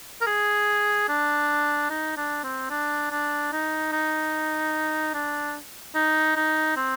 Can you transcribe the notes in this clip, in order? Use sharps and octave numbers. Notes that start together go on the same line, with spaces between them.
A#4
G#4
D4
D#4
D4
C4
D4
D4
D#4
D#4
D4
D#4
D#4
C4